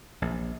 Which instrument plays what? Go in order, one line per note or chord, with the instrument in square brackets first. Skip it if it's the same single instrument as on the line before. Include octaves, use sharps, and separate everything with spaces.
[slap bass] A#1